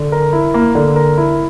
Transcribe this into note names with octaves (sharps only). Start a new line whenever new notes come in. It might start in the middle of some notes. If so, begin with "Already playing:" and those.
Already playing: D3
A#4
E4
A#3
D3
A#4
E4